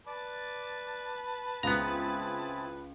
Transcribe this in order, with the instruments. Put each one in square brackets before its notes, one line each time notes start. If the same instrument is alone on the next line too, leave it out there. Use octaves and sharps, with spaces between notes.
[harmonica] B4 A5 [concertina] D5 D6
[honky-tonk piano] C#2 [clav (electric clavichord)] B3 A#5 [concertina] C4 E4 G#4